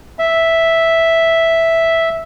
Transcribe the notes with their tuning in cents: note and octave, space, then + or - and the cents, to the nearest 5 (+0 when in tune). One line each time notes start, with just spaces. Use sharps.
E5 -5